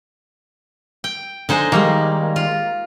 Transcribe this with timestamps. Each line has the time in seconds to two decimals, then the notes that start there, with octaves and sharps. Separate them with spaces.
1.04 G5
1.49 D3 G#3 D#4 C5 G#5
1.72 D#3 G3 G#3 A#3
2.36 F4